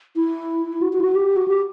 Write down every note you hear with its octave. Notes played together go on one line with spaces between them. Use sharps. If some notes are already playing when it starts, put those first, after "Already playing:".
E4
F#4
F#4
E4
F#4
G4
F#4
G4